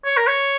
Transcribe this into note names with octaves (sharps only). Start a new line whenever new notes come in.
C#5
A#4
C#5